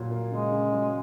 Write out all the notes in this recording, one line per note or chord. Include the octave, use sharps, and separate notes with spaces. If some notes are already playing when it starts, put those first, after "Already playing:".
Already playing: A#2 F#3 A#3
A#3
C#3 G#3
C#3
F#3